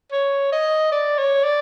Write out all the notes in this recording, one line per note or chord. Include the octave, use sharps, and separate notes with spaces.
C#5
D#5
D5
C#5
D5